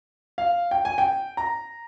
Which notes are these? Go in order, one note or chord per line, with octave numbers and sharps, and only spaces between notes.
F5
G5
G#5
G5
A#5